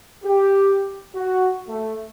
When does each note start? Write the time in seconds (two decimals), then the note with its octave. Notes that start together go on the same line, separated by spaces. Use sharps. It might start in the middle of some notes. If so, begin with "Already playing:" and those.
0.24 G4
1.15 F#4
1.68 A3